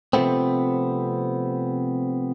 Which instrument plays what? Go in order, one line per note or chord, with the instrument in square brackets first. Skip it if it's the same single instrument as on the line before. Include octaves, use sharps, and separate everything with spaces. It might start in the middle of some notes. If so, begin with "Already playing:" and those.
[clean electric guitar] C3 F3 F#3 A3 B3 C4